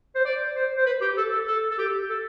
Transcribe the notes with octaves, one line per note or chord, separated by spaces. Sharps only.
C5
D5
C5
C5
B4
G4
A4
A4
A4
A4
G4
A4